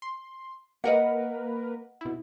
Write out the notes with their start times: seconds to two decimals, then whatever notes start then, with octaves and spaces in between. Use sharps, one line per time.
0.02 C6
0.84 A#3 A#4 B4 D#5 F#5
2.01 B2 E4